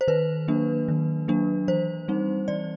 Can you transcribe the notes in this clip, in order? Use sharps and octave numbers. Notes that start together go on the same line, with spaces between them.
C5
D#3 B4
F#3 A#3 D4
D#3
F#3 A#3 D4
E3 C5
G3 C4 D#4
E3 D5